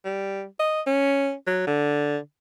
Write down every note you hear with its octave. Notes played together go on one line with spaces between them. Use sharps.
G3
D#5
C#4
F#3
D3